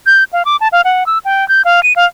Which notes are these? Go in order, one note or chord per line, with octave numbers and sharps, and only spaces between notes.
G6
F5
D6
A5
F5
F#5
E6
G5
G6
F5
D#7
F5